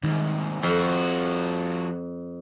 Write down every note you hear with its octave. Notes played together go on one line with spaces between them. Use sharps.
C2 G#2 D#3
F2 F3 F#4